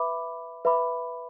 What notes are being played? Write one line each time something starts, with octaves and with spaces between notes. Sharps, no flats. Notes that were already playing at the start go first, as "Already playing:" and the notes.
Already playing: B4 E5 B5 D6
B4 E5 B5 D6